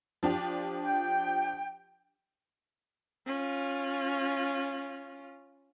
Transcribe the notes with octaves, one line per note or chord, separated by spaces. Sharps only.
F3 D4 G4
G5
C#4 F4